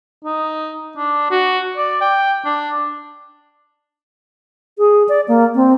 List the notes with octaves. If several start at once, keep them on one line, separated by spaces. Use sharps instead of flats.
D#4
D4
F#4
D5
G5
D4
G#4
D5
A#3
C4